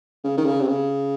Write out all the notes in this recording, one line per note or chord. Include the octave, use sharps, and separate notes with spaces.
C#3
D#3
C#3
C3
C#3